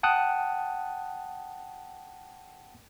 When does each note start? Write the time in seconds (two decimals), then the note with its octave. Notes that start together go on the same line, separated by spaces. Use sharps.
0.03 F#5 G5 A5 D#6 F#6